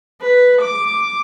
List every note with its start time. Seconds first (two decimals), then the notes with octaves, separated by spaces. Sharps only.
0.21 B4
0.61 D6